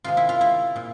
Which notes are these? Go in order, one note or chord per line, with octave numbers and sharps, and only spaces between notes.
C3 D#3 G#3 F4
E4
F4
E4
A#2